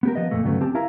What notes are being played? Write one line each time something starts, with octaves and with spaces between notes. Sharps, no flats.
B3 G4 A#4
F3 B3 D#5
F2 A#2 A3
D2 G2 C#3 F#3 A3 B3
C4 G4 A5
E4 A#4 E5 F5 A#5